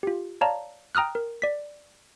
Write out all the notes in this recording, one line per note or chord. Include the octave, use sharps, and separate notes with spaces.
F4 G4
C#5 D5 F5 A5 A#5
G5 A#5 D#6 F6 F#6
A#4
D5 B6